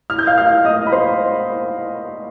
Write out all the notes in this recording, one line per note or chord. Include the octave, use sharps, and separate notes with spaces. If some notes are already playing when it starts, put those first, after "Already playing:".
F6
G6
F5 F6
F5 F6
D#5 D#6
B5
C5 C6